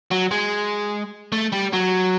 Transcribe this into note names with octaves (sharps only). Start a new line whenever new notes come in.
F#3
G#3
A3
G3
F#3